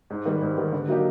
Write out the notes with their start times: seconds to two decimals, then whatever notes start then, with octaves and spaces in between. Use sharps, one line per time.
0.10 G#2
0.25 D#3 G3 B3
0.41 G#2
0.57 D#3 G3 B3
0.73 D3
0.88 F#3 A#3 D#4 G4